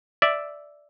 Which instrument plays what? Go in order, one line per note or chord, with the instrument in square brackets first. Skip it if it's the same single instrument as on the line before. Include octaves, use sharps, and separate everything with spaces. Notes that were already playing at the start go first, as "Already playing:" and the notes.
[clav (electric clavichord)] D5 E5